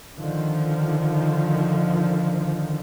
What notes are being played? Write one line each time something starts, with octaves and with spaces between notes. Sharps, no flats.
D3 D#3 F3